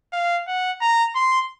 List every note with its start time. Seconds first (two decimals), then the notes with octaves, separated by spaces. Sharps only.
0.12 F5
0.47 F#5
0.81 A#5
1.15 C6